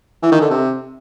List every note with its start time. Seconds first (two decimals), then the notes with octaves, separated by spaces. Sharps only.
0.22 E3
0.32 D#3
0.41 D3
0.51 C3